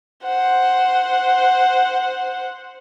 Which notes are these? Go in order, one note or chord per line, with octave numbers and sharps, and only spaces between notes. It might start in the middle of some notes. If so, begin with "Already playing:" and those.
C5 F#5